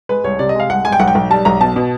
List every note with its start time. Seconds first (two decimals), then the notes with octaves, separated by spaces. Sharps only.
0.09 G#3 B4
0.24 C2 C#5
0.39 C3 D5
0.49 D#5
0.55 G#3
0.60 F5
0.70 C2 F#5
0.85 G#3 G#5
0.92 G5
1.00 B1 F#5
1.08 G5
1.15 B1
1.30 G3 A5
1.45 B1 A#5
1.60 B2 A5
1.76 B2